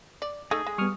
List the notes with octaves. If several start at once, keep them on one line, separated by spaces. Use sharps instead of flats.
D5
A3 D#4 G#4
G#3
G3 B3 C#6 D#6 F6